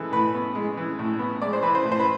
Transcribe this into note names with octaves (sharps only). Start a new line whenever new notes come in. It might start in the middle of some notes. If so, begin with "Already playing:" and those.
Already playing: E3 G#3 A4
A2 B4
B3
G#3
E3
A2
B3
G#3 D5
C5
E3 B4
C5
A2
C5
B4